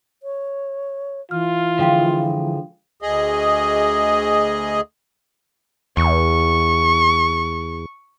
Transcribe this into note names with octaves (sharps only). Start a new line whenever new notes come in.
C#5
E3 F4 F6
D3 F3 G#3 F5 G5 C6
D2 G#4 D#5
E2 C#6